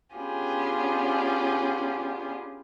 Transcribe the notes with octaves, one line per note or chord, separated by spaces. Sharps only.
B3 C#4 D4 F4 G4 G#4